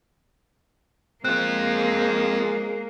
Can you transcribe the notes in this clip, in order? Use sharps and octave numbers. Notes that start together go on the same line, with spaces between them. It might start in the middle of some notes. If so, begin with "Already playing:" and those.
G#3 A#3 C4 F4 F#6